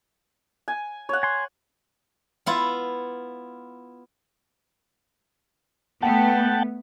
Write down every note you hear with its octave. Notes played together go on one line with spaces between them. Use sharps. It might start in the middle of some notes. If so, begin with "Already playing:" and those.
G#5
C#5 F#5
G#5 C6
B3 E4 F4
A3 B3 F#5 G5 A5